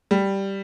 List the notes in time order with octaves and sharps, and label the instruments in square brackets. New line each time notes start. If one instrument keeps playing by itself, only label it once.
[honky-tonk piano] G3